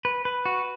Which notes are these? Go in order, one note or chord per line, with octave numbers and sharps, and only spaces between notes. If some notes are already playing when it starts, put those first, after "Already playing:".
B4
B4
F#4